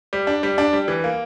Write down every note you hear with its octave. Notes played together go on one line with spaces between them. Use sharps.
G3
D4
G3
D4
G3
E3
A#3